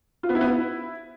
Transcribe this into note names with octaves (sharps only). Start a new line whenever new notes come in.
F4
B3
E4
B3
E4